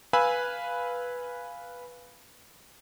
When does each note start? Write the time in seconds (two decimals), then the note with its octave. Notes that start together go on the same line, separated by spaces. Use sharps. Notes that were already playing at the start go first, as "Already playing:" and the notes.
0.13 B4 F5 G#5 B5 E6